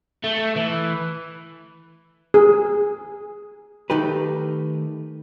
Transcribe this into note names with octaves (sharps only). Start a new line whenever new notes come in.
A3
E3
G#4
D#3 A3 D#4 G4 B4